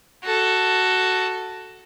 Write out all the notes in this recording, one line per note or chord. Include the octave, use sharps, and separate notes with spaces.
F#4 A4